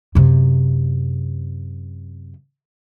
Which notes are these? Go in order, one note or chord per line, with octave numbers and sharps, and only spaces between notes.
F#2 C3